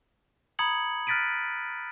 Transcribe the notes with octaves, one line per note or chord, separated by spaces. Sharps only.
A#5 B5 D#6 G#6 C#7 F#7
F6 F#6 A6 B6 D7 D#7